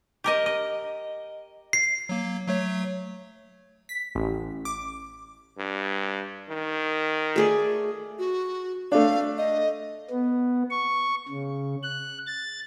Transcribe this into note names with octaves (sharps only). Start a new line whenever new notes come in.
G4 A#4 D#5
D#5
C7
F#3 A#3
F#3 A3 C#5
B6
A1
D6
G2
D#3
A3 G#4 D5
F#4
A3 D4 F5
D#5
B3
C#6
C#3
F#6
A6